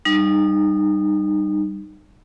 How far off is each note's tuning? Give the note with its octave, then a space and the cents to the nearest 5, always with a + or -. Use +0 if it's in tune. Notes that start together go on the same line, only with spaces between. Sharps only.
G3 +0 D#4 -25